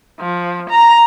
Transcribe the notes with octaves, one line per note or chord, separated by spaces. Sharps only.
F3
A#5